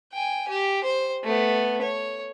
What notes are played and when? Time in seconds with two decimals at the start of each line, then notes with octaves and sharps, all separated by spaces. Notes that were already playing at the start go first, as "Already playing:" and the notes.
0.12 G5 G#5
0.48 G4
0.84 C5
1.23 A3 B3
1.81 C#5